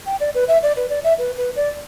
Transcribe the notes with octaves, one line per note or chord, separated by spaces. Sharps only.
G5
D5
B4
E5
D5
B4
D5
E5
B4
B4
D5